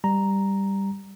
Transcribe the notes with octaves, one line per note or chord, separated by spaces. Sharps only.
G3 A#5